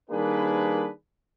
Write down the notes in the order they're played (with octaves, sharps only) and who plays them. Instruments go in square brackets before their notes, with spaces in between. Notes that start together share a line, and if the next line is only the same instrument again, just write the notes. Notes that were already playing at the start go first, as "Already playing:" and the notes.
[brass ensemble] D#3 G3 A#3 D4 G#4 B4